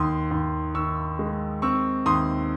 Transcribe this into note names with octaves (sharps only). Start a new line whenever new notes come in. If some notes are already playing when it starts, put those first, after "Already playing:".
Already playing: D#2 C6 D#6
D#2
D#3 C#6 E6
G#3
C4 C#6 E6
D#2 C6 D#6